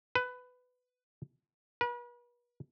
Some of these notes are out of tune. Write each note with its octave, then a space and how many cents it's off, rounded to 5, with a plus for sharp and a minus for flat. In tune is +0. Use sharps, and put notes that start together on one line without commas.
B4 +15
B4 -40